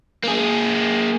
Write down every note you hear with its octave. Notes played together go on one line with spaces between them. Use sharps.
A#3 G#4